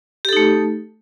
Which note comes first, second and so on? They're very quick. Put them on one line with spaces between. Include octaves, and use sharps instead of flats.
G4 A4 D#4 A3